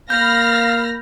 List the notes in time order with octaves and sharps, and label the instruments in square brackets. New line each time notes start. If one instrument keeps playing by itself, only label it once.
[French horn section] A#3 [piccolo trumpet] F5 [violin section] B5 F6 A#6 [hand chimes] G6